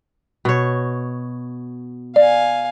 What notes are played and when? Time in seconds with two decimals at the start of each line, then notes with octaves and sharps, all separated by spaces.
0.45 B2 C#5
2.16 D5 F5 G#5